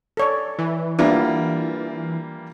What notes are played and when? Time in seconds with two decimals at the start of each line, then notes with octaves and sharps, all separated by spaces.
0.17 A4 C#5 D5
0.59 E3
0.99 G3 A#3 B3 D4 E4 F4